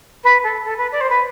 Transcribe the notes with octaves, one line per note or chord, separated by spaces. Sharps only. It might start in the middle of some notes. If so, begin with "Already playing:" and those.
B4
A4
A4
B4
D5
C5
B4